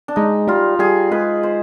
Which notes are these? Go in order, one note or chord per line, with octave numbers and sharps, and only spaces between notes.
D4
G#3 D#4
G3 F4
G3 G#4
G#3 B4
C5